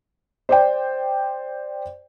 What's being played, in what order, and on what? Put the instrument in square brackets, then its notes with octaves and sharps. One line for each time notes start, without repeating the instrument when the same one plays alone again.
[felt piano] C5 D5 G5